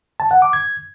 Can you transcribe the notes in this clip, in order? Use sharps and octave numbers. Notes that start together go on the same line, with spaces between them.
A5
F#5
D6
G#6